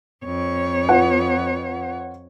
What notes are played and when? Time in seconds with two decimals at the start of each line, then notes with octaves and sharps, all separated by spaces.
0.25 F2 C#5
0.89 F4 B4 F#5